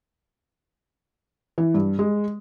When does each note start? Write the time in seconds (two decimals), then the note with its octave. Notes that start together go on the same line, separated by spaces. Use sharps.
1.58 E3
1.74 G2
1.99 G#3